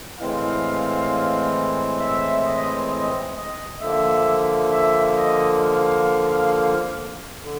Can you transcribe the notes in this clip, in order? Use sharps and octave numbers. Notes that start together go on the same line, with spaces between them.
A2 E3 G#3 C4 F5
E5
D#5
D#5
D#5
D3 F3 A#3 E5
E5
D#5
F5
D3